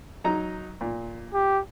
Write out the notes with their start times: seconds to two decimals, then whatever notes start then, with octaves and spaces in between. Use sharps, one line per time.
0.24 F#3 D#4 A#5
0.81 A#2
1.34 G4